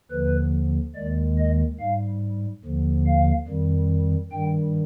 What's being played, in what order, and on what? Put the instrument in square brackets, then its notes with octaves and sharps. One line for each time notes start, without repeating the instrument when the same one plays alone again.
[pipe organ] D#2 D3 F3 B4
D#2 D#3 G#3 D5
D#5
G#2 G3 F5
D#2 D3 F3
F5
F2 D#3 G3
G2 D#3 G3 G5